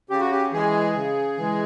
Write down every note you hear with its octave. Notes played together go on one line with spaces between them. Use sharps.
C#3 G4
F#4
G4
E3 G#3 G#4
C#3
E3 G#3